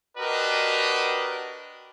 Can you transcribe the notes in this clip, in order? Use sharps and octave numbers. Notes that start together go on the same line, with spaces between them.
D4 F#4 G4 A#4 B4 D#5